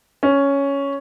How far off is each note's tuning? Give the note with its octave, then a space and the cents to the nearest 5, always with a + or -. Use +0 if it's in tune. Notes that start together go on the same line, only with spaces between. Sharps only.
C#4 +5